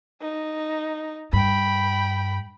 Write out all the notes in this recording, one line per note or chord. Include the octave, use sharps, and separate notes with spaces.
D#4
G2 G5 B5